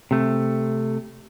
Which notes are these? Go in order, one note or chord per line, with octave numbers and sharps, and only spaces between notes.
C3 A3